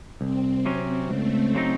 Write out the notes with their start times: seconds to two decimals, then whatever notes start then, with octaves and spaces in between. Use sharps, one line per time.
0.21 C2 C4
0.66 C3 F#3 C#4
1.09 C#2 A3
1.55 C#3 F#3 C4 D#4